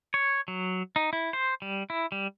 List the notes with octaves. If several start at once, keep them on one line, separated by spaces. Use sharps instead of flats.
C#5
F#3
D#4
E4
C5
G3
E4
G3